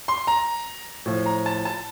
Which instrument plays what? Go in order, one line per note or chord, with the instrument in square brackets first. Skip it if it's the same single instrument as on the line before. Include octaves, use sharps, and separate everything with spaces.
[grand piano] C6
A#5
A2 F3
A#5
A5
A5